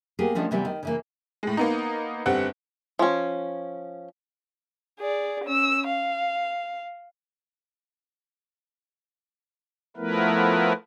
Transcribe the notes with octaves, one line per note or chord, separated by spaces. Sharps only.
A#3 B3 G4 G#4
D#3 F3 A3 C#4 D4
C3 E3 G3 B3 C4
D#3
C#3 E3 A#3
A2 G#3
A#3 B3 D#4
G1 G3 C4 F#5
F3 C#4
G#4 D5
C#4 E6
F5
F3 A3 B3 E4 A#4 B4